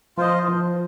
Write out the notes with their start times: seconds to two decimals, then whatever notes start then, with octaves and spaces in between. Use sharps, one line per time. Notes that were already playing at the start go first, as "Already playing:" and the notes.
0.17 F3 F4 C5 D#5
0.48 F3